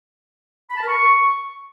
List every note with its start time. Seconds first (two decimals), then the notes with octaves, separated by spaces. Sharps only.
0.70 B5
0.76 A5
0.82 A#4
0.88 C#6